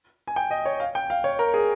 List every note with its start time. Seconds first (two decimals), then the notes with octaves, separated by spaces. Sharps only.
0.27 G#5
0.36 G5
0.51 D#5
0.65 C#5
0.80 F5
0.95 G5
1.10 F5
1.24 C#5
1.39 A#4
1.54 G#4